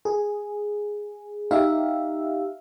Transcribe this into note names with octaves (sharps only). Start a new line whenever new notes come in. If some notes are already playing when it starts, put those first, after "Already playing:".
G#4
D#4 G4 E5 F5